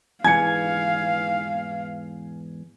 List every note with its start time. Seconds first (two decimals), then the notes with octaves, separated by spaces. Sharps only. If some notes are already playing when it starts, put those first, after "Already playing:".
0.24 E2 G#2 E3 F5 G#5 G#6 C#7